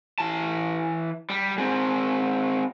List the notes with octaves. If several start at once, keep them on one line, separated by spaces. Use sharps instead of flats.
E3 A5
G3
G#3 C4